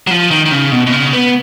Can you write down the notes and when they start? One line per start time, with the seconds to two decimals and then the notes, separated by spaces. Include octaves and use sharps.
0.07 F#3
0.11 F3
0.31 D#3
0.46 D#3
0.51 C#3
0.72 B2
0.87 B2
0.92 C#3
1.13 B3